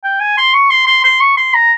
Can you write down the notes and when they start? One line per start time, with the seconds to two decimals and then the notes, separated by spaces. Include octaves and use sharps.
0.04 G5
0.20 G#5
0.38 C6
0.54 C#6
0.70 C6
0.87 C6
1.04 C6
1.20 C#6
1.37 C6
1.54 A#5